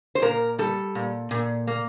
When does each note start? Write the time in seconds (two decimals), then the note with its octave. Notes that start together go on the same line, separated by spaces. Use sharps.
0.15 C5
0.22 A#2 A#4
0.58 G3 A4
0.95 A#2
1.31 A#2
1.67 A#3